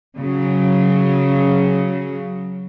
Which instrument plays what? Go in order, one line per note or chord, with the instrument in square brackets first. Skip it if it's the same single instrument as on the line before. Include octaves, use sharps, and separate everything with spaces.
[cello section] C#3 F#3